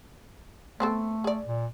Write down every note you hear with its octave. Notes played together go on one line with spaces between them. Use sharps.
A3 B3 C4 A4
G#4 D5
A#2